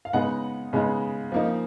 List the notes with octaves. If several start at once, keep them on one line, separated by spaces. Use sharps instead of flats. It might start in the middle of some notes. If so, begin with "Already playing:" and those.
F5
C#3 G#3 B3 D#4 F#5
C#3 G#3 B3 D#4
F3 A#3 D#4